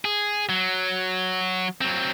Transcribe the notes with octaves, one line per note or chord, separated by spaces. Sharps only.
G#4
F#3
F#3 C4